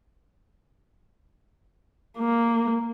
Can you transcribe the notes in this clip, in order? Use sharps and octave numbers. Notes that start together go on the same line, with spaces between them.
A#3